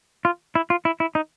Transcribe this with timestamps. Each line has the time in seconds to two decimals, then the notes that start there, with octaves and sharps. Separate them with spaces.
0.25 F4
0.55 E4
0.70 F4
0.85 E4
1.00 E4
1.15 D#4